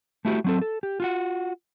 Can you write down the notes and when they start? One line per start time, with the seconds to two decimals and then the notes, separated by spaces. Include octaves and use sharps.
0.25 A3 E4 F#4 G4
0.44 F#3 C4 A4
0.61 A4
0.83 G4
1.00 F4 F#4 F#5